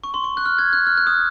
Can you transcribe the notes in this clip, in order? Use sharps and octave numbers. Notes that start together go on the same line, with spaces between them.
C#6
C6
C#6
F#6
F6
G#6
F#6
F6
F#6
D#6